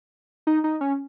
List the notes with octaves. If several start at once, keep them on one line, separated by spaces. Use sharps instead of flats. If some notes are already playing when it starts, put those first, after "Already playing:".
D#4
D#4
C#4